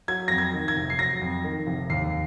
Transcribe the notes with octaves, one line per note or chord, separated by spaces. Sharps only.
F#3 G#6
F2 A#6
G#6
D#3
G#6
F1
C7
F#3 A#6
F2
D#3
F1
D#2 C7